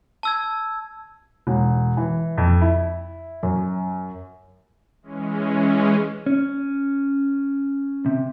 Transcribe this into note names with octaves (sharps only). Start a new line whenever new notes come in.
A5 E6 G#6
E1
E3
F2
E4
F#2
E3 G#3 C#4
C#4
C3